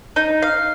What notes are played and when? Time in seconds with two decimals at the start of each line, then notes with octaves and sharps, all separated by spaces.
0.16 D#4
0.42 F5